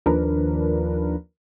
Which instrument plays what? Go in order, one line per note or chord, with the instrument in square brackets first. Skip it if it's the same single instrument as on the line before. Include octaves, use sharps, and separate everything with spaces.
[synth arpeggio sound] D#2 F3 D4 A#4 B4